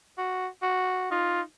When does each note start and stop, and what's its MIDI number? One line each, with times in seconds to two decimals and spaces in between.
0.18 0.46 66
0.62 1.07 66
1.11 1.43 63
1.11 1.41 65